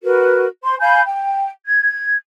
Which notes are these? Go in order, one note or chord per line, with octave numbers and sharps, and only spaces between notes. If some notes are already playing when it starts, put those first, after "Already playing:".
F#4 A#4 B4
C5 C6
F5 G#5 B5 G6
G5
G#6